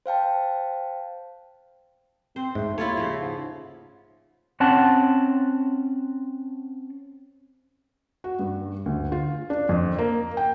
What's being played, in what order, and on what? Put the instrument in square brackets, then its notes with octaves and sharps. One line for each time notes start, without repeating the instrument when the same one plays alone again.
[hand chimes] C5 F5 G5 A5
[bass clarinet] C4 [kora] C5
[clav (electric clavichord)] G#2 [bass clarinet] A3
[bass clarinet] D#2 [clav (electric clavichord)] A3 [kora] E4 F4 C#5
[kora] C#3 F3
[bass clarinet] G#2
[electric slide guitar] C4 C#4 F#5 A5
[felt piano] F#4
G2
D2
F4
D4
F2
A#3
G5